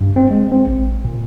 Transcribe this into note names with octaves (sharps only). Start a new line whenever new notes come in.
G2
C4
G#3
C4
A1
A#2